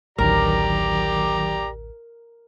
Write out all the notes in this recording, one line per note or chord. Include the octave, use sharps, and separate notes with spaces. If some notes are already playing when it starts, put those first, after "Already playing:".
A1 D2 D#3 F#3 G4 A#4 D5 A#5